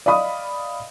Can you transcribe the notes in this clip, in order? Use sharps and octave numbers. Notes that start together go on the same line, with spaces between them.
D5 D#5 F5 B5 D#6